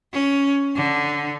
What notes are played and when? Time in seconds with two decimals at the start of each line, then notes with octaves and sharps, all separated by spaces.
0.13 C#4
0.76 D3